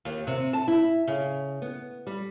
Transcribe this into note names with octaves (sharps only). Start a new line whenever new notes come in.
D#2
C3
A5
E4
C#3
B3
G3